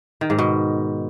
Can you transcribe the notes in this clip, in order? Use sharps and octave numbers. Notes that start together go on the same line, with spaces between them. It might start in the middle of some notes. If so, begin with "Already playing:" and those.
D#3
G#2
B2